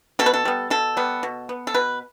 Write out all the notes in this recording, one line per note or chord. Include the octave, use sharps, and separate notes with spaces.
B2 A4
B4
A4
G3 B3
B2 A4
G3 B3
B2
B3
A4
B2 B4